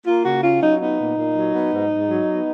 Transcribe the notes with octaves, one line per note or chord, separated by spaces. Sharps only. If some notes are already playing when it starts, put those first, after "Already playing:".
A#3 F4
C#3 F#4
C#4 F4
F#3 D#4
B3 D#4
A#2
A#2
F#3
B3
G#2
G#2
F#3
B3